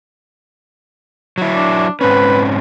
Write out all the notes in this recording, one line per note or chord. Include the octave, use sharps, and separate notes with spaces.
F#3 E4
D4
G#2 C4 C#4 B4